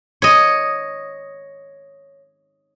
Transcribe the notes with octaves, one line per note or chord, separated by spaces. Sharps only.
C#5 D#5